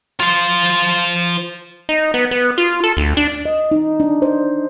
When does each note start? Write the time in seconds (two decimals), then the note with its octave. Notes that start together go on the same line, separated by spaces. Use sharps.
0.20 F4 C5
1.89 D#4
2.14 B3
2.31 B3
2.58 F4
2.84 A4
2.97 D2
3.17 D4
3.45 D#5
3.71 D#4
4.00 D4
4.22 C5